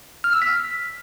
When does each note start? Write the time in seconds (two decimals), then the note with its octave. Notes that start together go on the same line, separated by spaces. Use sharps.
0.24 F6
0.33 E6
0.42 B6